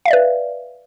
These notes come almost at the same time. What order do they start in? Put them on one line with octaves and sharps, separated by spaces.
F5 E5 D5 B4